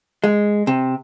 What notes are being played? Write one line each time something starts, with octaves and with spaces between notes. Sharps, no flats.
G#3
C3